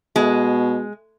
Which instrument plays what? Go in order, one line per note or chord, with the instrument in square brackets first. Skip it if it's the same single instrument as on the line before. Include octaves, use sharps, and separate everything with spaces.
[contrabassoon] B2 [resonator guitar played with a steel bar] G#3